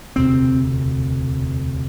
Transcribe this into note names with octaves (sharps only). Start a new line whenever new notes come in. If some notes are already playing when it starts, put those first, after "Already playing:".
E1 D2 C3 C4